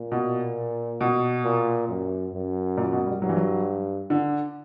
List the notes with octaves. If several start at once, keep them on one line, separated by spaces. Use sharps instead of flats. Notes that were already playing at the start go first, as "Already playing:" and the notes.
Already playing: A#2
B2
B2
A#2
F#2
F#2
A#2
B2
G3
G2 F#3
E3
F#3
D3